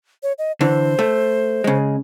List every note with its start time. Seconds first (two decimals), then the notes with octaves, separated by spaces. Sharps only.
0.23 C#5
0.38 D#5
0.61 D3 E3 C5
0.99 A3
1.64 C#3 G#3